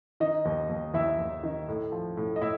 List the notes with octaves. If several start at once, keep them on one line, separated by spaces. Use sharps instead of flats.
D#3 D#4 D#5
D#2
D#2
D#2 E4 E5
D#2
D#3
A2
F3
A2
D#5
A2 E4 E5